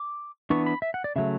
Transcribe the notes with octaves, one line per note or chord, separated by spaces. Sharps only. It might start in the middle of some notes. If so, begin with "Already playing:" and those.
Already playing: D6
E3 B3 D4 C#6
B5
E5
F#5
D5
C#3 F#3 A3 E5